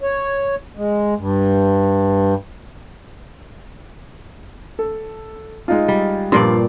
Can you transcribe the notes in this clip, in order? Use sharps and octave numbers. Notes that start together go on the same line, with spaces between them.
C#5
G#3
G2
A4
G#3 D#4 F4
G3
G2 A#2 F3 D4 D5 C6